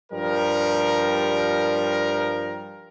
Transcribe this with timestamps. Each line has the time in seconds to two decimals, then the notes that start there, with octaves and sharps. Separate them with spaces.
0.13 G2 F3 G3 A#4